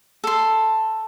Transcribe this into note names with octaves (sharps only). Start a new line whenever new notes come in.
A4 C6